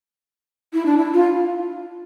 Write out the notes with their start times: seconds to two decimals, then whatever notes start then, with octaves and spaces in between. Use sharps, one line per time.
0.73 E4
0.86 D4
0.98 E4
1.14 F4